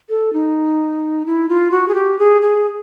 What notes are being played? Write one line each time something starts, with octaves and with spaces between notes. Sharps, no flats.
A4
D#4
E4
F4
F#4
G#4
G4
G#4
G#4